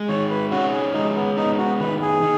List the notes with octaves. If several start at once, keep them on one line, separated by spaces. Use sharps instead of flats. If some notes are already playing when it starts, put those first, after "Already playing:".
Already playing: G#3
D#3 C#5
B4
C#4 F#4
G#4
G#3 D#4
B3
B3 D#4
F#4
D#3 B4
G#4
D#3